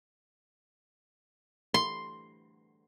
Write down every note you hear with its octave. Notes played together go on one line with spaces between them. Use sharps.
C6